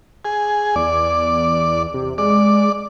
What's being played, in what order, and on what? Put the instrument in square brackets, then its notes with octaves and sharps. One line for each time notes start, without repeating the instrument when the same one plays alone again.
[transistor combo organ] G#4
[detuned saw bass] E2 [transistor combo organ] D5
[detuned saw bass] C3
[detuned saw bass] G#3 [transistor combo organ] D5